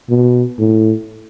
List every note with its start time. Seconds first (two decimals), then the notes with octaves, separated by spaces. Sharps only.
0.09 B2
0.58 A2